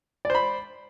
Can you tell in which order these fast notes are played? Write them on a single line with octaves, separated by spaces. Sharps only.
D5 C5 B5